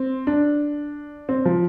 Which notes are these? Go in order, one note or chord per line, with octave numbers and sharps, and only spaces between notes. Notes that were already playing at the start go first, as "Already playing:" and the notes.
Already playing: C4
D4
C4
F3